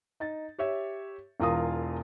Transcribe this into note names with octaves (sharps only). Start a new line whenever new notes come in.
D#4 A6
G4 C#5 E5
E1 E2 F4 A#4 F5 D#6